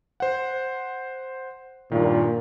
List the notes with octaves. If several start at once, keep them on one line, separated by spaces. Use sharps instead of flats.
C5 F#5
G2 A#2 D#3